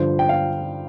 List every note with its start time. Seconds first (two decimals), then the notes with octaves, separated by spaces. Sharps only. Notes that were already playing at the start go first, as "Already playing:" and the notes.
Already playing: G2 D3 F3 C5
0.19 G5
0.29 F5